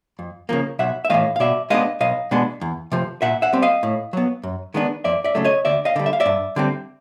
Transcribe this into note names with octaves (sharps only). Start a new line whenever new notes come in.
F2
C#3 F3 A#3
B1 E5 F#5
E5
A2 E3 A3 D#5 F5
F5
B2 D5 E5
G#3 B3 D4 D#5 F5
B1 D#5 F5
B2 G#3 B3 D4
E2
C3 F3
A#2 E5 F#5
E5 F#5
G3 C4
D#5 F5
A2
F#3 B3
F#2
D#3 G#3 B3 D4
F2 D5 E5
D5 E5
C#3 F#3 A3
C#5 D#5
D2 D5 E5
D#5 F5
D3 G3
E5
F5
D5 E5
G2
D3 G3 C4